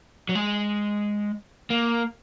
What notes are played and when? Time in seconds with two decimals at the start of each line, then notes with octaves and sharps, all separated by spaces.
0.29 F#3
0.35 G#3
1.70 A#3